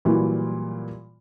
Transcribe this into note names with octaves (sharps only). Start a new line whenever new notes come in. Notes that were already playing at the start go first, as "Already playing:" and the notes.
A#2 E3 F#3 G3 E4 F4